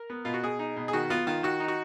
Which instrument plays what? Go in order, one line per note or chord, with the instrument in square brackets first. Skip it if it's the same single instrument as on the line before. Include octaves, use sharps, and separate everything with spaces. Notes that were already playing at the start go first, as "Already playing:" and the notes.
Already playing: [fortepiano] A#4
B3
B2 F4
F#4
B2 G#4
D#4
B2
G#4
D#3 F#4
B3 F4
D#3 F4
D#3 F#4
D#4
F#4